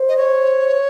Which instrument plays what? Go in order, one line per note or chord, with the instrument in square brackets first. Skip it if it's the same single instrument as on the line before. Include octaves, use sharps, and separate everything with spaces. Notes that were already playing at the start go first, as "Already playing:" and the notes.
Already playing: [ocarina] C5
[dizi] D#5
C#5